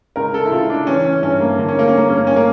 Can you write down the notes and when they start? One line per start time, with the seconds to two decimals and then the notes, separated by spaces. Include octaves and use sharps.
0.16 C#2 A#4
0.34 A4
0.46 E4
0.52 C#3 F4
0.70 D4
0.87 E3 C#4
1.05 C#4
1.23 G2 C#4
1.40 A#3
1.59 D3 A#3
1.69 C#4
1.79 A#3
1.88 C#4
1.95 G2 A#3
2.08 C#4
2.17 A#3
2.27 C#4
2.36 A#3